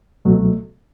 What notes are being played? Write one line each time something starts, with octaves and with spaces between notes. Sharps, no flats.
C#2 B2 F#3 A3